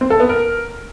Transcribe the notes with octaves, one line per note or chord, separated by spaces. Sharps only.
C4
A4
B3
A#4